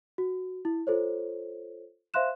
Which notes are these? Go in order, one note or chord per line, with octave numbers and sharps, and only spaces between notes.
F#4
E4
F4 A4 C5 C#5
C5 E5 F5 C6 F#6 E7